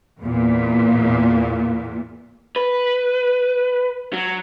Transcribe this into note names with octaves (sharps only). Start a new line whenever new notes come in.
E2 A#2
B4
F#3